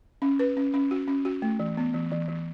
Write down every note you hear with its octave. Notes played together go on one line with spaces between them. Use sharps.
C#4
B4
C#4
C#4
F#4
C#4
F#4
A3
E3
B3
E3
E3
E3